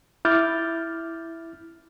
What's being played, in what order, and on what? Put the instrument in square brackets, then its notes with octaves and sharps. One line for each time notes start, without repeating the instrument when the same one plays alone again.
[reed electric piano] E4 D6 F6 G6 A6